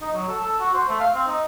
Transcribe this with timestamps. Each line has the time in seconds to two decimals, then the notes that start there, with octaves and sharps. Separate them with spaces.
0.01 D#4
0.14 F#3
0.29 A4
0.40 A4
0.60 F#4
0.74 C5
0.89 A3
1.00 F5
1.15 C4
1.27 D#4